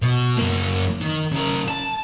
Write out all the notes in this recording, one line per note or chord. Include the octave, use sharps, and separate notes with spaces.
B2
F#2 A#3
D#3
C#3 A#4
A5